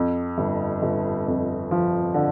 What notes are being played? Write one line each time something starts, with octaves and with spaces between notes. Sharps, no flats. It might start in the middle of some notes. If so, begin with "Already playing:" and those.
Already playing: F2
G1
G1
F2
F3
D3